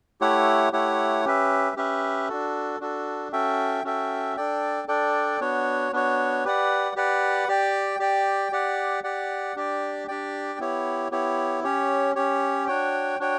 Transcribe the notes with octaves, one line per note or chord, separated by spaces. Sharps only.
A3 E4 G4 C#5 F#5
A3 E4 G4 C#5 F#5
C#4 G4 B4 E5
C#4 G4 B4 E5
D4 F#4 A4
D4 F#4 A4
C#4 F#4 A4 E5 G5
C#4 F#4 A4 E5 G5
D4 A4 D5 G5
D4 A4 D5 G5
B3 D4 F#4 C#5
B3 D4 F#4 C#5
G4 B4 D5 F#5
G4 B4 D5 F#5
G4 D5 G5
G4 D5 G5
G4 D5 F#5
G4 D5 F#5
D4 G4 D5 G5
D4 G4 D5 G5
B3 E4 G4 C#5
B3 E4 G4 C#5
C#4 G4 C#5
C#4 G4 C#5
D4 F#4 C#5 G5
D4 F#4 C#5 G5